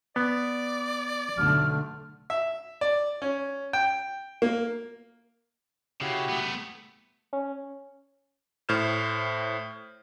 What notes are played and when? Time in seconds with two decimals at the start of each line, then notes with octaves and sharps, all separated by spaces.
0.16 B3 D5
1.38 B1 D3 A3 F6
2.30 E5
2.81 D5
3.22 C#4
3.73 G5
4.42 A#3
6.01 C#3 E4 F#4 G4
6.29 A3 B3
7.33 C#4
8.69 A2 C5 F6 G6 E7